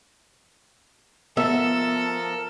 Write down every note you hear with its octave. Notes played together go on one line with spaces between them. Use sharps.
F3 B3 A4 A#4 E5